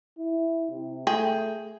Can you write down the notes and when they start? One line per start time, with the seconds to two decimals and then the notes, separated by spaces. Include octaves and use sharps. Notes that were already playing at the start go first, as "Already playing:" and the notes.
0.18 E4
0.71 C3
1.07 A3 G#4 G5